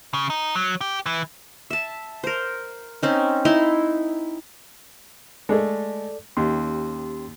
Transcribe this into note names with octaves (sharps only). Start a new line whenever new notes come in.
C#3
D#4
F#3
G4
E3
E5 A5
A#4 C5
C4 C#4 D#4
D#4 E4 C6
G#3 A3 A4 D5
D#2 C#4 G4 C6